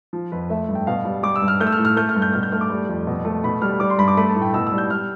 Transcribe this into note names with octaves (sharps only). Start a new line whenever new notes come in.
F3
F2 B4
A3 E5
G2
G5
B2 F5
G3
G3 D6
E6
G2
F6
A3 G6
E6
F6
A2
F6
A3 G6
F6
G2
G6
B2 F6
G6
A3 F6
D6
G3
F2
B2
A3
B2 B5
G3 F6
G3 D6
C6
G2 B5
D6
A3 B5
A5
A2
G5
B2 E6
E6
G3
G6
G3 F6